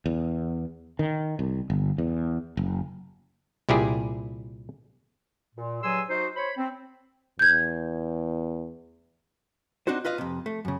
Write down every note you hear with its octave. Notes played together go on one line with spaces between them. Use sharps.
E2
D#3
C2
G1
E2
F#1
C2 A#2 E4 G4 G#4
A#2
G2 F#3 G#4 G#5 C6 E6
D#4 F#4 C5
C5 C#5 B5
C4
E2 G6 G#6
C4 D4 D#4 F#4 C5
F4 B4 D#5 F5
F2 C3
A3
F#2 C#3